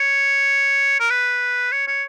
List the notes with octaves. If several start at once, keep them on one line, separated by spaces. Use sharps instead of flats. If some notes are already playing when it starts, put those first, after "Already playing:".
Already playing: C#5
A#4
B4
C#5
C#5